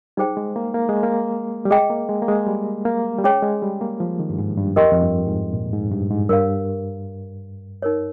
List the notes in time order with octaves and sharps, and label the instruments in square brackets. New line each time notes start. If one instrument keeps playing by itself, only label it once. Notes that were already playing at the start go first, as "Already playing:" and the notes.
[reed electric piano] G3 [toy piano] D#4 G#4 C5 G5
[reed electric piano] G#3
A#3
A#3
G#3
A#3
G3
[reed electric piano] G#3 [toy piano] G#4 D#5 G5
[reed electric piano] A#3
G#3
A#3
G#3
G3
A#3
G3
[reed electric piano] G#3 [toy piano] C#4 G#4 C#5 G5
[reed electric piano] G#3
G3
A#3
F3
D#3
G2
G#2
G2
[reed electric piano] F2 [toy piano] G4 A#4 D#5 G5 C6
[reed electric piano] F2
G2
G#2
A#2
G#2
G2
G#2
[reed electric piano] G2 [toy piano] A#4 C#5 F5
[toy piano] D#4 A#4 C#5